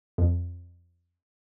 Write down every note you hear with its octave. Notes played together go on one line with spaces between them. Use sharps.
F2